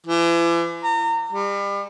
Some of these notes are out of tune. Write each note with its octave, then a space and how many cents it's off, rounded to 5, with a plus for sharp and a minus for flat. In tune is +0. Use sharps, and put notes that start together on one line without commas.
E3 +40
A#5 -30
G3 +35